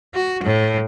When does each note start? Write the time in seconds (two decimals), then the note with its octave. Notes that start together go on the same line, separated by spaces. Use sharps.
0.14 F#4
0.44 A2